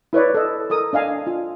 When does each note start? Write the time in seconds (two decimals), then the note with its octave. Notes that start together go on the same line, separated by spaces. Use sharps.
0.13 E4 B4 C#5 D5
0.34 A4 D#5
0.70 A4 A#4 D#6
0.93 D4 D#5 F5 G#5
1.27 F4